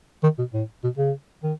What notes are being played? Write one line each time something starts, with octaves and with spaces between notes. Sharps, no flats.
D#3
B2
A2
B2
C#3
D#3